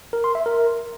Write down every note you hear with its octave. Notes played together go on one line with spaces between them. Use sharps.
A#4
C6
E5
A#4